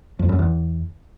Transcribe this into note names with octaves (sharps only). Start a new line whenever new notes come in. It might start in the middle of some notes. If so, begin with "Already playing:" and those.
F2
F#2
E2